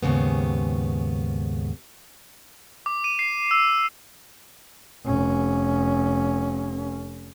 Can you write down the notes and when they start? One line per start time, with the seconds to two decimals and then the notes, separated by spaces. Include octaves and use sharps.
0.03 D#2 G#2 C#3 B3
2.86 D6
3.04 D#7
3.19 C7
3.51 E6
5.05 F1 C#4